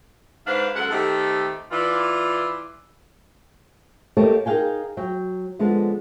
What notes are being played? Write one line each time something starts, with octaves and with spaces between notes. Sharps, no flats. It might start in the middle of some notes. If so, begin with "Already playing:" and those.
G#2 D4 B4 C5 F5
F#2 G#3 A4 F#5
D#3 A3 C4 D#4 G4 A4
E3 F4 D5
A3 A#3 G4 A4 C#5 D#5
D#4 G#4 A#4 F5 G5 G#5
F#3 G5
D3 F3 G#3 B3